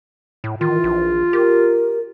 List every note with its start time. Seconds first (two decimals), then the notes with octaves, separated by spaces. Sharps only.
0.44 A2
0.61 D#3 E3 F4
0.84 A#1
1.33 G4 A#4